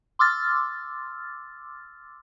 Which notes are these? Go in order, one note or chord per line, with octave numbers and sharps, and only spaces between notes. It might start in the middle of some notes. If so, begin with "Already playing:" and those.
C6 D6 E6 F6 A6